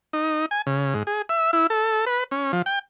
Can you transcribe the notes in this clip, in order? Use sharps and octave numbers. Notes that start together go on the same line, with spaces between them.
D#4
G#5
C#3
G#2
G#4
E5
E4
A4
B4
C#4
F3
G5